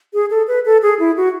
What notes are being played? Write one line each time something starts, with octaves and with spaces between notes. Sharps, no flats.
G#4
A4
B4
A4
G#4
E4
F#4